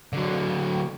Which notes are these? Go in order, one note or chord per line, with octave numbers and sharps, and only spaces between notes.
D3 F#3